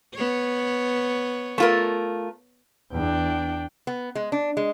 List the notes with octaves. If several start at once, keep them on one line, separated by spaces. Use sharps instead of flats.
B3 C#5
A3 F4 A#4
E2 D4 G5
B3
G#3
D4
G#3